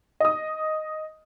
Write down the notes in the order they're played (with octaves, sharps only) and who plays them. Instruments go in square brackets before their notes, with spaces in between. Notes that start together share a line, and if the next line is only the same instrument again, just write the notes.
[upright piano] D#5 D#6